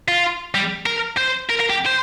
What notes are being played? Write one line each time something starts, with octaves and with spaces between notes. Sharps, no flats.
F4
G3
A#4
C5
A#4
A#4
G4
C5